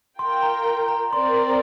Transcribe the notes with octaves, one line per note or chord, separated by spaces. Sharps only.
F4 A#4 G5 C6
A#5
A#5
C4 A#4 D5 C6